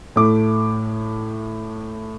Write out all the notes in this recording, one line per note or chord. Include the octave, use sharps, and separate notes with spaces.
A2 A3 D6